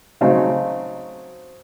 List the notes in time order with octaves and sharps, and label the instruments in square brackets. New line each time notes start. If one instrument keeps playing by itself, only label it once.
[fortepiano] C#3 F#3 A3 C4 D#4